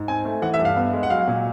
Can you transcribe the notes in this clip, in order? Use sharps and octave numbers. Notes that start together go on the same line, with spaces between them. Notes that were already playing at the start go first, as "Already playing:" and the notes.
Already playing: G#2
C4 G#5
A3
E3 F#5
E5
G2
F5
B3
G#3
F#5
F#3 F5
A#2